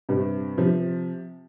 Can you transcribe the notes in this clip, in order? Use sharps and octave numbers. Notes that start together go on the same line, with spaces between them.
G2 C3
C3 F3